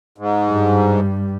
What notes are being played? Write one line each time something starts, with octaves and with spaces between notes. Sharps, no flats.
G#2
G2 G3